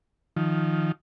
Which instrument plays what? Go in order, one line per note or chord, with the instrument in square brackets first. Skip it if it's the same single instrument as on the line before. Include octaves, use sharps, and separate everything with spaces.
[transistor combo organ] D#3 F3